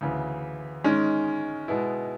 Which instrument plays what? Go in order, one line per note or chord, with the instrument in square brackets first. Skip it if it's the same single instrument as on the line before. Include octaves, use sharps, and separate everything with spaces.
[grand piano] D2 C#3 E3
D#3 G#3 C#4
B2 G#3 B3 E4